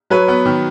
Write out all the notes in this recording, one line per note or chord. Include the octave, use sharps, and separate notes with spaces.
F#3 B4 C#5
B3
D#3